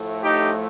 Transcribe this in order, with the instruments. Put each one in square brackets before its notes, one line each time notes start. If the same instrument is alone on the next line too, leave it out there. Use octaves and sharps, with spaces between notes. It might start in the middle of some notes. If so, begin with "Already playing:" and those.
Already playing: [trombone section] A2 F3 A3
D#4 G4